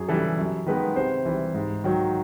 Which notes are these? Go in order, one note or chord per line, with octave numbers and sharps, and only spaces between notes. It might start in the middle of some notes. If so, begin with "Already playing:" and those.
Already playing: F#2 G#4
C#3 E3 G3 A4
F#2
D#3 G#3 B3 B4
C3 C5
E3 G3
G#2
D#3 F#3